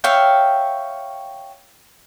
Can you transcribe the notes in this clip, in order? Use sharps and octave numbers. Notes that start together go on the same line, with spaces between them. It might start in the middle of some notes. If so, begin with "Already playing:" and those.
C#5 E5 F5 G5